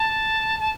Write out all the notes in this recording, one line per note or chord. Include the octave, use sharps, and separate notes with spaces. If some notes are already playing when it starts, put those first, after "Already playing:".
Already playing: A5
A5